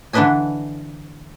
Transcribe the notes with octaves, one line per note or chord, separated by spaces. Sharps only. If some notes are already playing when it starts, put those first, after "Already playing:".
D3 E3 D4 B4 D#5 G#5